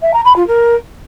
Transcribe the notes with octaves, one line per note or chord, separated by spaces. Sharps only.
E5
A#5
B5
F4
A#4